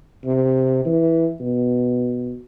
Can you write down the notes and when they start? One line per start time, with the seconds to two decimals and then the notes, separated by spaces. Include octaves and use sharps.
0.25 C3
0.85 E3
1.40 B2